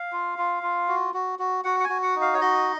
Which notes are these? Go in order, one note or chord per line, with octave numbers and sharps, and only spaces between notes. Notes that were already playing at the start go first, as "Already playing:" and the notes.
Already playing: F5
F4
F4
F4
F#4
F#4
F#4
F#4 F#5
F#5
G#5
F#4
F#5
D#4
F5
C#5
F#4 D#5